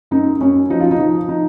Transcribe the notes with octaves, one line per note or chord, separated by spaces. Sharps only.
F#2 D#4
F#2 C#4
F3 D#4
F4
D#4
F3
D#4